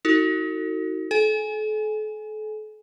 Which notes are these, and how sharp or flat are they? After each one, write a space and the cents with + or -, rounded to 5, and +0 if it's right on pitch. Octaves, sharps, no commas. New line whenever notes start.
D#4 +35 F#4 +5 A4 +45
A4 -40 G#5 +0